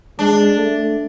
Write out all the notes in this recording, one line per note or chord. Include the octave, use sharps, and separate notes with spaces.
G#3 D4
A3